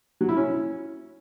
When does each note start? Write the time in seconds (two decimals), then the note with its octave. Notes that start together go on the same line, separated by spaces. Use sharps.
0.21 F#3
0.29 E4
0.37 C#4